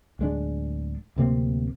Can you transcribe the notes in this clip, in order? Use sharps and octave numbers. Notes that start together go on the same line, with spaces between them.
D1 G#3 D4
D1 C3 A#3 C4